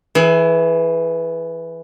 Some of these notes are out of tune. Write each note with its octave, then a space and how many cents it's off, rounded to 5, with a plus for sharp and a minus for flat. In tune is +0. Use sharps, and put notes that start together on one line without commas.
E3 +0 G#4 +35